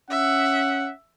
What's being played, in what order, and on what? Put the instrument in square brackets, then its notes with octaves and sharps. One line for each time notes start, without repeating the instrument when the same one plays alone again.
[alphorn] C#4 [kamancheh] E5 [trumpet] F#5